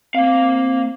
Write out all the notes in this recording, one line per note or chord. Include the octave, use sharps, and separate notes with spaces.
A#3 C4 F5